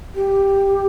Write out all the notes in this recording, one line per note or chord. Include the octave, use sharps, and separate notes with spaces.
G4